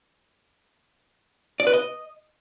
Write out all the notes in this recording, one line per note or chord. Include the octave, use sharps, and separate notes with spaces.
D5
B4
D#5